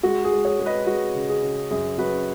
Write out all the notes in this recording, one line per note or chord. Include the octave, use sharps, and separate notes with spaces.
G#3 F#4
G#4
G#3
G#4 C#5
G#3
B4 D#5
G#3 F#4 B4
C#3
G#4
C#3
F#2 G#4
F#2 F#4 B4